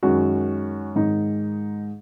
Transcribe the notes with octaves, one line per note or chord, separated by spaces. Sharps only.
F#2 D#3 G#3 F#4
G#2 D#3 G#3 D#4